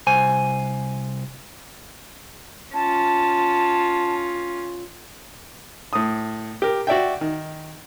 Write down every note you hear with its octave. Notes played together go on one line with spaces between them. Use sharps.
C2 C5 G#5
C#4 F4 A5
A2 D#6
G4 A#4
F#4 D5 E5 G5
D#3